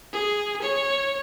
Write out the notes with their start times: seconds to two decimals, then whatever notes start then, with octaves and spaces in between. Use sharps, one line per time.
0.13 G#4
0.62 C#5